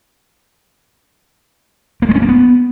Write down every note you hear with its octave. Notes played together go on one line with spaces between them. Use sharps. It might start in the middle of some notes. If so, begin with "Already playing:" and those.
A#3
G#3
C#4
A#3
B3